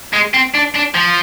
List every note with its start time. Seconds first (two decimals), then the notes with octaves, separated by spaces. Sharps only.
0.13 G#3
0.34 C4
0.54 D4
0.75 D4
0.95 F3